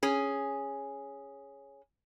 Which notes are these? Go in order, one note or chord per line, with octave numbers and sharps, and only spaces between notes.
C#4 G#4